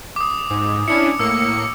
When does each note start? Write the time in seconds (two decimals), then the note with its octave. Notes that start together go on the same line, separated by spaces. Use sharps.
0.16 D6 D#6
0.51 G#2
0.88 C#4 D4 E4 C#7
1.20 A2 A#3 E6 C#7